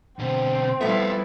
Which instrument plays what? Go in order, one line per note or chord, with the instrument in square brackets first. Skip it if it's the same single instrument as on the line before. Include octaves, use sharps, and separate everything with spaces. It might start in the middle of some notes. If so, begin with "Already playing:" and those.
[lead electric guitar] B2 D3 [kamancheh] C4
[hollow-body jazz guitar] F3 A3 B3 [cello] G3 E4 [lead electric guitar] E5 F5